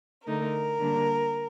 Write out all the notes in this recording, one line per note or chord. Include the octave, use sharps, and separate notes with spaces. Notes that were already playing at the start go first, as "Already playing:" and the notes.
D3 A3 D#4 A#4
D3 G3 A#3 D4